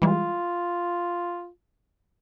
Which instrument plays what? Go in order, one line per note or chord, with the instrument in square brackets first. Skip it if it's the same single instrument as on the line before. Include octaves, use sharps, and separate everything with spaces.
[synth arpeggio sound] E3 G3 G#3 [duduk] F4